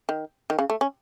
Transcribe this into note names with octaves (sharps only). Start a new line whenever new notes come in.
D#3
D#3
C#3
A3
C#4